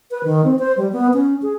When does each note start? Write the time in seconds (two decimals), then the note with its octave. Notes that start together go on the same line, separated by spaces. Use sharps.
0.11 B4
0.24 D#3
0.44 C4
0.59 C5
0.77 G3
0.93 B3
1.13 C#4
1.42 G#4